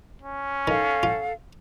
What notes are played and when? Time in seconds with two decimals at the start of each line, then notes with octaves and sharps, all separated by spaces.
0.22 C#4
0.67 D#3 A4 F5 F#5
1.03 F4